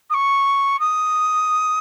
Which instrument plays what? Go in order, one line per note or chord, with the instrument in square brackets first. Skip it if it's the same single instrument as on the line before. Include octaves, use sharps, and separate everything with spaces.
[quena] D#6
C#6
D#6